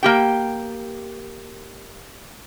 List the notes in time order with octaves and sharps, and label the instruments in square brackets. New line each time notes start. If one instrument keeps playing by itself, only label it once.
[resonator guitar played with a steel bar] A#3 G4 G5